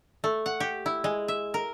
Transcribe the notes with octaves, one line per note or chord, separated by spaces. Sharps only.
A3
F#5
G4
E4
G#3
E5
A#4